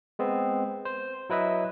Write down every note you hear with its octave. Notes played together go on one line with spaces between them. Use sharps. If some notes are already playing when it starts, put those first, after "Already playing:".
G#3 B3 C4
C5
F#3 E4 B4 D#5 E5